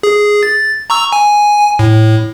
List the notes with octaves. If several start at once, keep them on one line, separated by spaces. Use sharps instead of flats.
G#4
A6
A#5 C#6 E6
G#5
A2